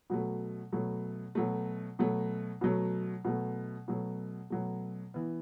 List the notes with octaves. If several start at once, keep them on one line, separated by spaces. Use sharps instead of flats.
B2 F#3 A3
B2 F#3 A3
B2 F#3 A3
B2 F#3 A3
B2 F#3 A3
B2 F#3 A3
B2 F#3 A3
B2 F#3 A3
E3 B3